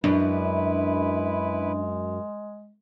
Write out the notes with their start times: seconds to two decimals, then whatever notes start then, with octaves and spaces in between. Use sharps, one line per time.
0.04 F#2 G#3 D4 E4 B4